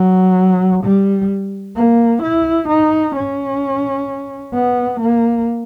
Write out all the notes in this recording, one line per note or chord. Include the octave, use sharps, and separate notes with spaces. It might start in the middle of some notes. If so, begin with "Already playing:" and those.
Already playing: F#3
G3
A#3
E4
D#4
C#4
B3
A#3